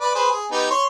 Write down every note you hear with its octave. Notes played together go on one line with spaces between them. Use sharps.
B4 D5 D6
G#4 B4 C5
G#4
B3 D#4 G4
C#5 C6